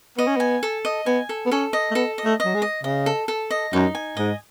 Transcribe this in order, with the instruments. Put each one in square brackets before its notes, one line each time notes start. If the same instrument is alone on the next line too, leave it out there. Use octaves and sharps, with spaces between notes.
[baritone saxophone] B3 [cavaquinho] D#5
[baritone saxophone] C#4
[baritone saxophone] B3 [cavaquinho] G#5
[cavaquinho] A4
D#5
[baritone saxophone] B3 [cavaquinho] G#5
[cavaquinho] A4
[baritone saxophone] B3
[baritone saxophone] C#4 [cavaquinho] A4
[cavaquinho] D#5
[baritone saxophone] A3
[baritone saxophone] B3 [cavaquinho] A4
[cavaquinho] D#5
[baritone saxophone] A3
[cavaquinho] D#5
[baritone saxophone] F#3
G#3
[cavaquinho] D#5
[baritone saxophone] C#3 [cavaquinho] D#5
[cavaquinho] A4
A4
D#5
[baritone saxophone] F#2 [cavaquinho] D#4
[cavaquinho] G#5
[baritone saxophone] G#2 [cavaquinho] D#5